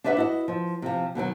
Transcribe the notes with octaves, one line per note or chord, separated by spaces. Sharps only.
D4 D#4 B4 E5 F#5
E4 F#4 D#5
F3
C3 F3
B2 D#3 F3 F#3